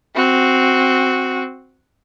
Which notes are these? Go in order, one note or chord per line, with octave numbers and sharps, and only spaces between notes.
C4 F#4